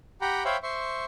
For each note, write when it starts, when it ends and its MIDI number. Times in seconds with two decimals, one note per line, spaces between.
0.21 0.43 67
0.21 0.43 78
0.21 0.43 79
0.21 0.43 82
0.21 0.43 83
0.45 0.57 72
0.45 0.57 73
0.45 0.57 76
0.45 0.57 77
0.45 0.57 79
0.45 0.57 83
0.63 1.05 72
0.63 1.05 76
0.63 1.05 84
0.63 1.05 85